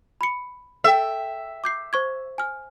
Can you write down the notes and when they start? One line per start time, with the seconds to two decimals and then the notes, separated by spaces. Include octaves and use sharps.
0.21 B5 C#7
0.84 A4 E5 G5
1.64 D6 G6 C7
1.93 C5 C#6 G#6
2.38 G#5 F6